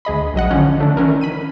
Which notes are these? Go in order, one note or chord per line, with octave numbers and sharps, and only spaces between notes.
D2 G#4 D#5 B5
A#1 F#3 D#5 F#5
D3 F3 C#4
D3 A3 D4
D#3 E3 C#4 A#4
B5 D#7